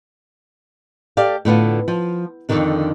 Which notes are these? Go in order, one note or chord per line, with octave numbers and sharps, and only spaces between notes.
G4 A4 D5 F5
A2 D3 B3 F4
F3
F2 A2 D3 D#3 D4